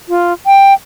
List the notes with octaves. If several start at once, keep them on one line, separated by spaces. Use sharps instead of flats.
F4
G5